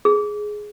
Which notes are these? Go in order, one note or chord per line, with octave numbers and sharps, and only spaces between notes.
G#4